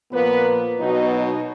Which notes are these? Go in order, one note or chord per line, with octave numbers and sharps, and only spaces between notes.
A#2 F3 A#3 B3 B4
B2 F#3 B3 D#4
D#4